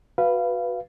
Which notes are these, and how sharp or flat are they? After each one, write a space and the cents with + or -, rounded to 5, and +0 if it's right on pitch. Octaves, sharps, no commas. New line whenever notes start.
F#4 +0 B4 +0 F5 -25